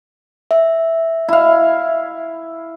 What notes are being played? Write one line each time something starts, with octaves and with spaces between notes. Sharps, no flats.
E5
E4 F5